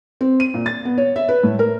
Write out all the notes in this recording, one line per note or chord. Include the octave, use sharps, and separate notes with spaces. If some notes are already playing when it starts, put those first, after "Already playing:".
C4
D#7
A#2
A6
B3
C#5
E5
B4
A2
A#4